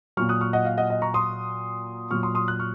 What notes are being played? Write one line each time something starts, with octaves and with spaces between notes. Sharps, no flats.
A#2 F#3 C#6 F6
D#6 F#6
C#6 F6
D#5 F#5
F5
D#5 F#5
D#5
A#5 C#6
C6 D#6
A#2 F#3 C#6 F6
C6 D#6
C6 D#6
F#6
C#6 F6